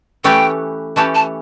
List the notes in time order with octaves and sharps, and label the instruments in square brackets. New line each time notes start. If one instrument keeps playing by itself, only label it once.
[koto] E3 A3 C#4 G4 B4 [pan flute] G5
[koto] E3 A3 C#4 G4 B4 [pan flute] A5
[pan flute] A5